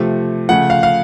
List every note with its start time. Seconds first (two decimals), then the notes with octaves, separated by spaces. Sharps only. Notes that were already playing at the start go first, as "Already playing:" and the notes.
Already playing: C3 F3 A3
0.49 C#3 F3 A3 F#5
0.70 F5
0.83 F5